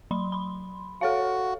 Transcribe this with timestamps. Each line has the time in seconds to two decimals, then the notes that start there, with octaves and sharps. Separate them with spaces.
0.11 F#3 B5 C6
0.32 B5 C6
1.01 F#4 A4 C#5 F5